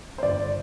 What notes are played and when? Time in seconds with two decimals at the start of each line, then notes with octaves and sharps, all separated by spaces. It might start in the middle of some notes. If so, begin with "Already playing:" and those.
0.18 C5
0.23 G1 D5